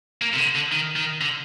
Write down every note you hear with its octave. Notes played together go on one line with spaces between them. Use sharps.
A#3
C3
D3
D3
D#3
D#3
D3